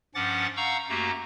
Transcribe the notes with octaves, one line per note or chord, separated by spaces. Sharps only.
G2 F3 C#4 F#5 D6 A6
F5 F#5 A#5 C#6 E6 G6
F#2 A3 A#3 F#4 G4 A#5